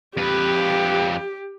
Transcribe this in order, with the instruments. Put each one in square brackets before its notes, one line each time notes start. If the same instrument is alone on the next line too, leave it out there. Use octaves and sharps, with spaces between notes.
[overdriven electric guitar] F2 B4 [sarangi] G4